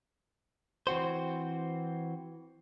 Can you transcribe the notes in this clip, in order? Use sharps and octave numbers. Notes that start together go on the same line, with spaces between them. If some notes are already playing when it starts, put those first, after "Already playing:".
E3 C4 F#4 C5